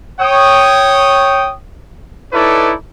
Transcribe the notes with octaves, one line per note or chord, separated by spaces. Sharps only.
C#5 G5 D#6
D#4 E4 A4 B4 C#5 D5